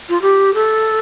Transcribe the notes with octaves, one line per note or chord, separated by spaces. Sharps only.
F4
G4
A4